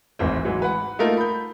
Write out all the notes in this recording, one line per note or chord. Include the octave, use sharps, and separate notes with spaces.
D1 G#1 E3 C4
G#2 E3 F#3
B4 F#5
A3 A#3 D#4 F4 A#4
B5 G6